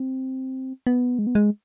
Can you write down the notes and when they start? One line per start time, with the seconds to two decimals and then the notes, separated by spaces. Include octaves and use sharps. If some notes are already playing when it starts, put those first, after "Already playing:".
Already playing: C4
0.87 B3
1.19 G#3
1.27 B3
1.35 G#3